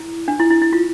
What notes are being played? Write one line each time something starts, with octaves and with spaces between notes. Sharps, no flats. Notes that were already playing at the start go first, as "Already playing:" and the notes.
Already playing: E4
D4
E4
E4
E4
F4